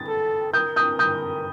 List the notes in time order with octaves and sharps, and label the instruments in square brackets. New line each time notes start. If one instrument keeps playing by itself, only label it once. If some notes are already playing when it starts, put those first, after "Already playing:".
Already playing: [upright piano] A6
[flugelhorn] A4
[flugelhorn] A#4 [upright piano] D#6 G6
[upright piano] D#6 G6
D#6 G6